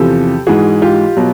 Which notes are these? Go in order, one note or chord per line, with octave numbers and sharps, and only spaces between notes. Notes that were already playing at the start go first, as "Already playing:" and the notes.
Already playing: E2 C3 F3 G4 A4
G#2 E3 F#4 G#4
F4 G4
B2 F#3